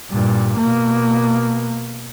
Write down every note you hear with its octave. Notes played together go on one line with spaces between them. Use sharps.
G2 A#2
B2 A#3